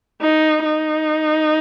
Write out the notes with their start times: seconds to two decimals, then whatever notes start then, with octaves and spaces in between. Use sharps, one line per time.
0.21 D#4
0.65 D#4